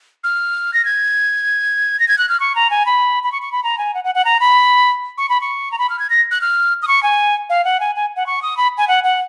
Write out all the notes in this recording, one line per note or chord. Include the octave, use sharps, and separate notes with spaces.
F6
A#6
G#6
A#6
G#6
F#6
F6
C#6
A#5
G#5
B5
B5
C#6
C#6
B5
A#5
G#5
F#5
F#5
F#5
A#5
B5
C#6
B5
C#6
A#5
B5
F6
G#6
A#6
F#6
F6
D#6
C#6
G#5
F5
F#5
G#5
G#5
F#5
C#6
D#6
B5
G#5
F#5
F#5